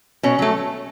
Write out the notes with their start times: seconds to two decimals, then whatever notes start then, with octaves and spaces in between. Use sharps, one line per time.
0.23 B2 C#4
0.39 F#3 A3